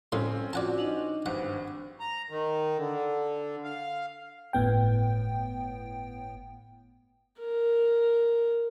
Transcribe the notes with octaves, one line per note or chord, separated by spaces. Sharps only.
C2 A2 C4 C#4 C6
F4 F#4 D5 F#5 A5
D4 D#4 D#5
G#1 G2 D4 C5 F#5
A#5
D#3
D3
F5
G1 A2 B3 G5
A#4